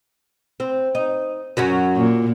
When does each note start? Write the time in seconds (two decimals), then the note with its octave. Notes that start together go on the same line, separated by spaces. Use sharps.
0.60 C4
0.95 D#4
1.57 F#2 F#3 C#4
1.95 A#2